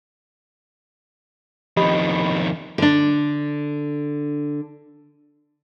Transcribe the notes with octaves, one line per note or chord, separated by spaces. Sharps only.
F2 D#3 G4 D#5 B5
D3 D4